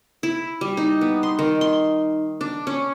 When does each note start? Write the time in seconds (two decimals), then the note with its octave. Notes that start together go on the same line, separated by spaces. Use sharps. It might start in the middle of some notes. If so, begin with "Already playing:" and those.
0.23 E4
0.61 G3
0.77 D#4
1.01 B3
1.23 C6
1.39 D#3
1.61 C6
2.41 D4
2.67 C#4